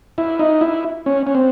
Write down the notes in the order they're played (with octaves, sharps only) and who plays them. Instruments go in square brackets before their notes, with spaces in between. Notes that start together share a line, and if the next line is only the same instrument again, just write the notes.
[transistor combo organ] E4
D#4
E4
C#4
C#4
C4